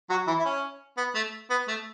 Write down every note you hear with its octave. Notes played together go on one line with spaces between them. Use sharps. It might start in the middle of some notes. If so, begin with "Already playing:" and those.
F#3 F#4
E3 E4
E4
C#4
B3
A3
B3
A3